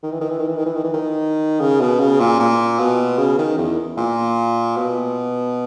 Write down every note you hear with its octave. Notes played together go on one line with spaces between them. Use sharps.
D#3
E3
D#3
E3
D#3
E3
D#3
E3
D#3
E3
D#3
C#3
B2
C#3
A#2
A#2
B2
C#3
D#3
E2
A#2
B2